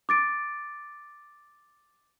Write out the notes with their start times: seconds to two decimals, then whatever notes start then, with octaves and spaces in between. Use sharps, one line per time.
0.09 D6 A6 D7